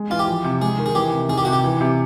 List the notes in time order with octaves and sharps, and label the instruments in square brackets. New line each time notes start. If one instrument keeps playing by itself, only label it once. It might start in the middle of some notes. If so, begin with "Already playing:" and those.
Already playing: [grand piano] G#3
[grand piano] E3 [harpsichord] F4
[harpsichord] G4
[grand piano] F3
C3
[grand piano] G#3 [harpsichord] G#4
[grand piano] D#3
[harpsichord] G#4
[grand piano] E3 [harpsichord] G4
[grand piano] C3
[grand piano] D#3 [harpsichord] G#4
[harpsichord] G4
[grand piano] C3 [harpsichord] F#4
[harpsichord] G4
[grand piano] E3
C3